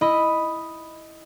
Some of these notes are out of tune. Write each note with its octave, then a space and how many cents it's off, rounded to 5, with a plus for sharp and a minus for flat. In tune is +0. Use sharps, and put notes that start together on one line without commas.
E4 +0 D#5 +0 B5 +0